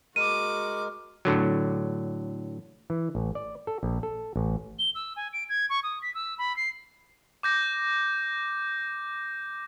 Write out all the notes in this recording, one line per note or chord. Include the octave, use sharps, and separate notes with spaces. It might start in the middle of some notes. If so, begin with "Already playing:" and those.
G#3 F#4 A#4 D6 D#7
A2 D3 F#3
E3
A1
D5
A4
A#1
A4
A1
G7
E6
G#5
D7
G#6
C#6
D#6
B6
E6
B5
C7
D6 G6 A#6